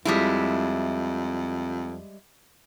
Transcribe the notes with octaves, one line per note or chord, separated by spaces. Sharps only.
F2 G3 G#3 E4